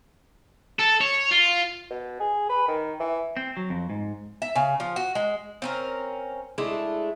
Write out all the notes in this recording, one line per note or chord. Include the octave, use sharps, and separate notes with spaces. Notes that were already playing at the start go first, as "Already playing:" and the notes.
A4
C#5
F4
B2
G#4
B4
D#3
E3
C4
F#3
F2
G#2
E5
C#3
F3
F#4
G#3
C4 C#4 A#4
G#3 A3 D4 E4